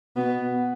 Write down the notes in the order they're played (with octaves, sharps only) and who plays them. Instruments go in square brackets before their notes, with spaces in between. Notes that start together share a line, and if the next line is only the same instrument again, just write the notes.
[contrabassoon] B2 [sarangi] B3